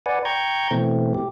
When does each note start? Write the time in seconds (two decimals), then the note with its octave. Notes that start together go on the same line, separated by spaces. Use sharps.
0.06 B4 D5 F#5 G#5
0.25 G5 A#5 C#6 G6 G#6
0.71 B2 E3 A3 C4
1.15 G4